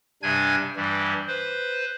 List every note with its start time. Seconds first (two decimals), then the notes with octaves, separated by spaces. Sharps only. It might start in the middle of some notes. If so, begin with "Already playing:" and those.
0.23 G2 C3 G3 D4 G#5 G#6
0.76 G2 E3 G3
1.28 B4 C5